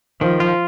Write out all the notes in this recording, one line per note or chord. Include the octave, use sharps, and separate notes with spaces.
D#3 F3
F4